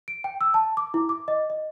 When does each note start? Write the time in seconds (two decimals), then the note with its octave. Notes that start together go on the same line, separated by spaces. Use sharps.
0.08 D7
0.24 G5
0.41 E6
0.54 A5
0.77 D6
0.94 E4
1.09 D6
1.28 D#5
1.50 D#5